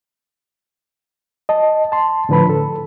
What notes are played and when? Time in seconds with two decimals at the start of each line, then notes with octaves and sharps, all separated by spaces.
1.49 D#5 A5
1.92 A5 C6
2.29 A2 D3 F3 B4 A5 B5
2.50 A4